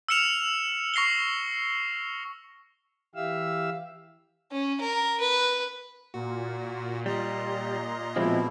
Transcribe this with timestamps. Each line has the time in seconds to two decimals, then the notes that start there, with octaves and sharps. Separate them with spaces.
0.09 E6 F6 C#7 E7 F7
0.94 C#6 A#6 C7 F7 G7
3.15 E3 G4 E5 F5 E6
4.52 C#4
4.81 A#4
5.21 B4
6.14 A#2 F#4
7.06 G3 D#5 A#5 C6
8.16 B2 F3 G#3 C4 E4